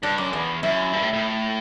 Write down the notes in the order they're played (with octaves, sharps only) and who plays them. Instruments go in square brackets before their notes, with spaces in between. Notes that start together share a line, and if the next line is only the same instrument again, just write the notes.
[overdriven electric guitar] G2 [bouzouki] D4
[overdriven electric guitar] F#2 [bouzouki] D4
[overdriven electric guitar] E2 [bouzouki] B3
[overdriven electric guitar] F#2 [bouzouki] E4
[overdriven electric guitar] G2
A2
A2